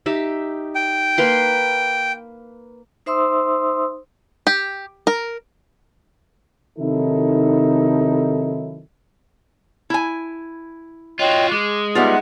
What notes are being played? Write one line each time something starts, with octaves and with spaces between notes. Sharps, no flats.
D#4 G4 E5
G5
A#3 B4 C6
D#4 C5 E5 C6 D#6 E6
G4
A#4
C3 D#3 F#3 D#4 E4 A4
E4 G#5
F4 F#4 C#5 D#5 G5
G#3 D6
G3 B3 D#4 F4 E5 F#5